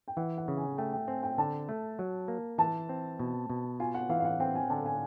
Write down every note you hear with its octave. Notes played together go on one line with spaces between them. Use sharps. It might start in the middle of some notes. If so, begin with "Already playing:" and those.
G5
E3 F#5
F#5
C#3
G#5
A3 G5
G5
C4 G#5
G5
D3 A5
A3
F#3
A#3
E3 A5
C4
B2
B2
F4 G#5
F#5
E3 F5
F5
F#5
C4 G5
G#5
D3 A5
G#5